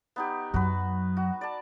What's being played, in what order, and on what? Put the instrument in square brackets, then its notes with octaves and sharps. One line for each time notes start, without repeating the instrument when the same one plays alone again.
[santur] B3 D#4 G4
[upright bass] F#2 F#3 [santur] F#4 B4
[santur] F#4
D5 A5